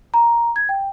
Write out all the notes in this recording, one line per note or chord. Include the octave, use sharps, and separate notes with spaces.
A#5
G#6
G5